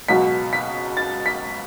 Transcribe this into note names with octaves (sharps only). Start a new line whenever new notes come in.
C#2 B2 F#3 B6
B6
A6
B6